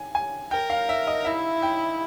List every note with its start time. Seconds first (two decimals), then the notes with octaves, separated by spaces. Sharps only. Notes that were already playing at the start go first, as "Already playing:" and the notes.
Already playing: G#5
0.15 G#5
0.51 A#4 G5
0.70 F5
0.89 E5
1.07 D#5
1.25 E4 E5
1.62 G5